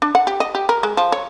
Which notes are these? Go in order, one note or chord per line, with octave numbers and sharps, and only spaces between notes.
D4
F#5
G4
D#5
G4
A#4
G#3
F3
C#5